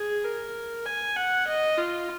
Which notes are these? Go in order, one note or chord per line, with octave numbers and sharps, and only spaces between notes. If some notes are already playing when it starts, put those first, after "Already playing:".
Already playing: G#4
A#4
G#5
F#5
D#5
F4